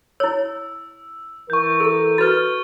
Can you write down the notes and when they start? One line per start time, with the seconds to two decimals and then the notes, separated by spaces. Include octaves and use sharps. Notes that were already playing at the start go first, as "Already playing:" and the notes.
0.20 E4 C#5 E6
1.50 E3 A#4 C#6 G6
1.80 G#4 A4 E6
2.18 F#4 B4 F6 A6